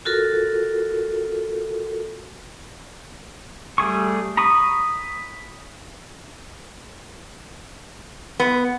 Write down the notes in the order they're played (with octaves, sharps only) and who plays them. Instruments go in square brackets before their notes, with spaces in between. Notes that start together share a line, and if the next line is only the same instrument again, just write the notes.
[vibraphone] F4 F#4 A4 A#4
[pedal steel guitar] G3 A3 G#4 C#6
A#5 B5 C#6 D#6
[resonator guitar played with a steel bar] B3